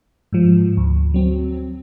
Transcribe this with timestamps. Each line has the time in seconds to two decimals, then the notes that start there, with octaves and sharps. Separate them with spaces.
0.33 G#2 F3
0.77 D2
1.14 F#3 C4